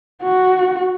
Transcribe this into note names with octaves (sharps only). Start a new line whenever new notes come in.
F#4